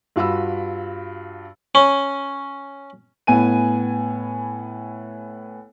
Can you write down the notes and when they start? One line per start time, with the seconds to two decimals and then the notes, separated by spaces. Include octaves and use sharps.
0.16 G2 F4 F#4 B5 E6
1.75 C#4
3.27 A2 B3 G#5 D#7